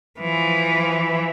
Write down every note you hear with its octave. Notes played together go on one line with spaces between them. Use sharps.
E3 F3